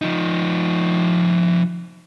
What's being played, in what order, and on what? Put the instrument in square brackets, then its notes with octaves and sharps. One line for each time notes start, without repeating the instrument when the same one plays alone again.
[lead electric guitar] F3 D#4